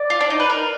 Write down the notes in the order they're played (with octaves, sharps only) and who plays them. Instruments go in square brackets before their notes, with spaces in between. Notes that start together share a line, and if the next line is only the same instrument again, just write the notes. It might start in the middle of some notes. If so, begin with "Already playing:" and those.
Already playing: [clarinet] D5
[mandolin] F4
D4
D#4
B4
A#4